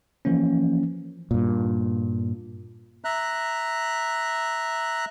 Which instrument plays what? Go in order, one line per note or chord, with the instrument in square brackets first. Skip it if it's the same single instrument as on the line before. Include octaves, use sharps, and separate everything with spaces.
[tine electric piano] E3 F3 A#3 C#4
[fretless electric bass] G2 A#2
[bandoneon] E5 A#5 F#6